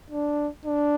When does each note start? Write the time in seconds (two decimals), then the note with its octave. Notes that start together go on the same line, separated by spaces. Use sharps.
0.10 D4
0.65 D4